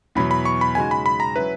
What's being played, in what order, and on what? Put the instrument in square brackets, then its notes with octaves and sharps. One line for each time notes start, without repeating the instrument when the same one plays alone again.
[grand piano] E2 B2 F#3 [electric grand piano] B5
[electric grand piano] B5
C#6
B5
[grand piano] C#3 G#3 D#4 F#4 [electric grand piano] G#5
[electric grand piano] B5
B5
A#5
[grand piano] F#3 C#4 E4 [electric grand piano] B4